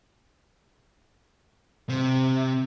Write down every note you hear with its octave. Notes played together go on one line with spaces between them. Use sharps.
C3